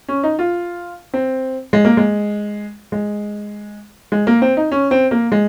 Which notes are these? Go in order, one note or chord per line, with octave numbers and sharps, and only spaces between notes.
C#4
D#4
F4
C4
G#3
A#3
G#3
G#3
G#3
A#3
C4
D#4
C#4
C4
A#3
G#3